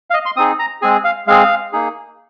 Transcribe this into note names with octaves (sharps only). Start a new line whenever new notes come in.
F5
D#5
C6
C4 D#4 G#4 D#6
A#5
G#3 C4 G#4 G#5
F5
G#3 C4 G#4 F5
A#3 D#4 G#4